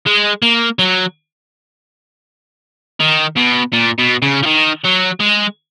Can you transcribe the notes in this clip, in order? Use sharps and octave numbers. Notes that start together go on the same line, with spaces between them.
G#3
A#3
F#3
D#3
B2
A#2
B2
C#3
F3
D#3
F#3
G#3